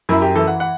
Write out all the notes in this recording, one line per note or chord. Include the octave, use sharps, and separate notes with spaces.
F#2 E4
G4
E3 A4
F#5
F#5